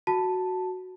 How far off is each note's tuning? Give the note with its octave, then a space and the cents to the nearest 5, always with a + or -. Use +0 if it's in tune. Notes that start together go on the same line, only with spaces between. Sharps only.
F#4 +0 A5 +0